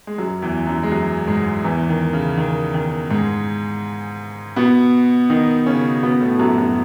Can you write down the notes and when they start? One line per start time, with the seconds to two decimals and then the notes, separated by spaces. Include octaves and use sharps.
0.07 G#3
0.18 F#2 F#3
0.42 E2 E3
0.67 F#2 F#3
0.83 G#3
0.91 F#2 F#3
1.28 G#2 G#3
1.64 E2 E3
1.89 D#3
2.13 C#3
2.38 D#3
2.74 D#3
3.10 G#2 G#3
4.56 B2 B3
5.30 D#3 D#4
5.66 C#3 C#4
6.03 B2 B3
6.21 A2 A3
6.39 F#2 F#3
6.57 F#2 F#3